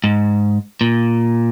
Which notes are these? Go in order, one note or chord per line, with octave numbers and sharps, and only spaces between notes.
G#2
A#2